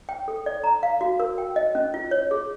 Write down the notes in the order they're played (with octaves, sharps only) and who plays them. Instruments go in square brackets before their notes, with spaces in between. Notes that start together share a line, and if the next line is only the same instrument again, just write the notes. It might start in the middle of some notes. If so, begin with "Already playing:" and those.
[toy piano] G5
A4
D5
A#5
F5
F#4
A#4
G5
D#5
C#4
F4
C#5
G#4